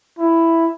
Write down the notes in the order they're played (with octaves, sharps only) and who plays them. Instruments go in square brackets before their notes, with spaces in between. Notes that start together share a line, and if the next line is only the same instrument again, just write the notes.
[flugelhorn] E4